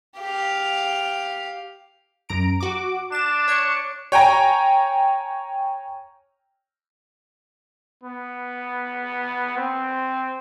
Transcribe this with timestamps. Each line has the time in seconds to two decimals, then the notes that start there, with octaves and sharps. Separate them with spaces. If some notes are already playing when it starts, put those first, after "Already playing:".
0.18 G4 F5
2.29 F#2 A#5 D7
2.60 F#4 D6
3.12 D4 A6 E7
3.48 C#5 C#7
4.12 C#5 G5 G#5 A#5
8.04 B3
9.57 C4